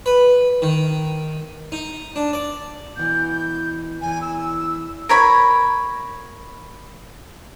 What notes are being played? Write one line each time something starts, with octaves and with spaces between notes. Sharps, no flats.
B4
D#3
D#4
D4
D5
B2 E3 G6
E2 E3 G#5
E6
A#4 C#5 B5